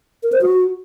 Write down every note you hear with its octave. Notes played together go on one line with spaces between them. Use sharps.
A#4
C5
F#4